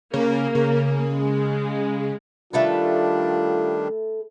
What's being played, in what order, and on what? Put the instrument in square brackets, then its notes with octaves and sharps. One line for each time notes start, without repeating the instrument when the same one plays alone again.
[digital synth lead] C#3 [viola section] A#3
[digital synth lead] C#3
[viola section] G#3
[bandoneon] D#3 G3 D4 [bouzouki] A3 A4 B4 [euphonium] F4